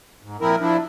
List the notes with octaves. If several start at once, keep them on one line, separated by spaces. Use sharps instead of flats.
G#2
A#2 F3 C4 E4 A#4
F3 D4 E4